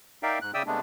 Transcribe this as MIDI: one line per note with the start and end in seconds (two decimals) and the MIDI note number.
0.23 0.39 63
0.23 0.39 70
0.23 0.39 74
0.23 0.39 76
0.23 0.39 77
0.23 0.39 79
0.42 0.51 44
0.42 0.51 90
0.54 0.63 49
0.54 0.63 74
0.54 0.63 76
0.54 0.63 79
0.54 0.63 87
0.54 0.63 88
0.66 0.80 48
0.66 0.80 56
0.66 0.80 57
0.66 0.80 59
0.66 0.80 62